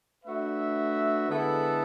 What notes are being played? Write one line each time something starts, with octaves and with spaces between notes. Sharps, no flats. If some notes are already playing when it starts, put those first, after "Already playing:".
A3 D4 F#4 B4 E5
D3 G#3 B3 E4 A4